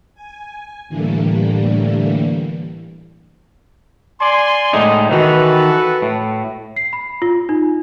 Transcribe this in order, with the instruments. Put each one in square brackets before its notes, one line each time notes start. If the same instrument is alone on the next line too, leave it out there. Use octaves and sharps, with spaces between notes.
[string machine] G#5
A2 D3 E3 G3 A3 A#3
[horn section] D5 G#5 C6
[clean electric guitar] A2 G#3 D#4
[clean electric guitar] D#3 E3 [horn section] F#4 A4 B4
[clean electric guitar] A2
[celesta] C7
B5
F4
D#4